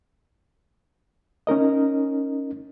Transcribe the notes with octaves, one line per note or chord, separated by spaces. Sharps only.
C#4 D#4 A#4 D#5